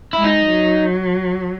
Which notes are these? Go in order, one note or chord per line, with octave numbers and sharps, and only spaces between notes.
G#3 E4
D#4
F#3